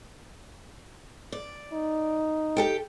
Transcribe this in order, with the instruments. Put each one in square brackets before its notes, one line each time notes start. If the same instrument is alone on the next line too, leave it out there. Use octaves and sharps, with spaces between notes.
[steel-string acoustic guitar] D5
[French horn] D#4
[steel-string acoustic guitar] G4 A4 G5